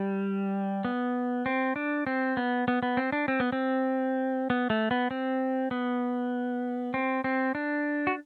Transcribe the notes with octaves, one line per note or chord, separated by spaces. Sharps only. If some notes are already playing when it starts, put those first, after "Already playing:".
Already playing: G3
B3
C4
D4
C4
B3
B3
B3
C4
D4
C4
B3
C4
B3
A3
B3
C4
B3
C4
C4
D4
F#4